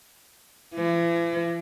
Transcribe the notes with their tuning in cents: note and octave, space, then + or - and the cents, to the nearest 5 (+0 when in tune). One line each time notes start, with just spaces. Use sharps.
E3 +45